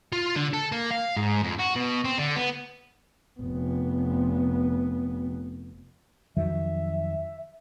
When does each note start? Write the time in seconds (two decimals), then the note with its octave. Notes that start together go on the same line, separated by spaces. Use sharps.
0.13 F4
0.36 D3
0.53 A4
0.72 A#3
0.91 F5
1.16 G#2
1.43 F2
1.59 F#4
1.75 B2
2.05 C4
2.18 D3
2.35 B3
3.40 F1 B3
6.37 F2 D#3 F#3 E5